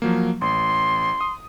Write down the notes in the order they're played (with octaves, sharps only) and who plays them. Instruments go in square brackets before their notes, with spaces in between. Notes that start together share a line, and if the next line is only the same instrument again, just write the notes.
[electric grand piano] F3 F#3 A#3
[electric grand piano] A1 [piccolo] C6
[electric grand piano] D#6